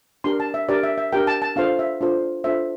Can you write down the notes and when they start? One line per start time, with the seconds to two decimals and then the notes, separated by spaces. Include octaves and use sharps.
0.24 D4 G4 A#4 C6
0.40 A5
0.54 E5
0.69 D4 G4 A#4 D5
0.83 E5
0.98 E5
1.13 D4 G4 A#4 G5
1.27 A5
1.42 A5
1.56 D4 F4 A4 C5 F5
1.79 E5
2.01 D4 F4 A4 C5
2.44 D4 F4 A4 C5 E5